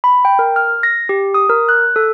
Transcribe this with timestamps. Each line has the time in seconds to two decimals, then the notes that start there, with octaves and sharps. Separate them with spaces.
0.04 B5
0.25 G5
0.39 A#4
0.56 F6
0.83 A#6
1.09 G4
1.34 D#6
1.49 A#4
1.69 F#6
1.96 A4